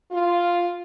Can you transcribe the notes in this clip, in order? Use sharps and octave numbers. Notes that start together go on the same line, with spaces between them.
F4